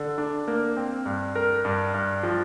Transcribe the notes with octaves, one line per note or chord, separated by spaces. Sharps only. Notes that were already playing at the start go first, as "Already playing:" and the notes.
Already playing: D3
D4
A#3
C4
G2
A#4
G2
G2
F3